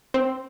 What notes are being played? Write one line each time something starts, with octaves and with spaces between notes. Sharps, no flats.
C4